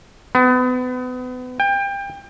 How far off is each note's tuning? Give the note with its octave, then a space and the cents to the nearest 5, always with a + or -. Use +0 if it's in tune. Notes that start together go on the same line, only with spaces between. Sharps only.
B3 +30
G5 +25